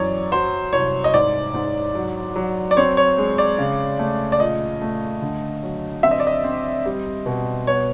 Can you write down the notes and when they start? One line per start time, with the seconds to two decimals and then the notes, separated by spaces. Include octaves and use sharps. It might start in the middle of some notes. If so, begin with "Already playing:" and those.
Already playing: F#2 E3 C#5 D5
0.32 F#3 C5
0.73 C2 C#5
1.04 D#5
1.14 G#2 D5
1.54 G#2
1.95 F#3
2.36 F#3
2.71 D5
2.77 C4 C#5
2.97 C#5
3.18 G#3
3.38 D5
3.59 C#3
3.99 A3
4.32 D5
4.40 A#2 D#5
4.81 A3
5.21 D3
5.63 F#3
6.03 C4 E5
6.11 D#5
6.20 D5
6.27 D#5
6.44 C4
6.86 G3
7.26 B2
7.67 B3 C#5